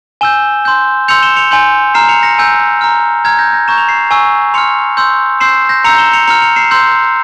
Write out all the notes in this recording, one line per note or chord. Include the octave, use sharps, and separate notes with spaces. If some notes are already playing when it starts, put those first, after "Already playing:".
G#5 E6 G6 E7 G7
C6 G6
C6 E6 G6 C#7 F7
E7 G7
C#7 F7
G#5 C6 G6
A#5 F6 C7 E7
C#7 F7
A#6 C#7
G#5 E6 G6
A#5 F6
A#5 F6 G#6
G6 A#6
G6 A#6
A#5 C#6 G6 E7
F7
C7 E7
G#5 C#6 E6
C6 F6 C#7 F7
C6 E6 G6
C6 E6 G6 C7 E7
G6 A#6
A#5 E6 G6 C#7 F7
E7 G7
C#7 F7
A#5 F6 C#7 F7
C#7 F7
C7 E7
C6 E6 G6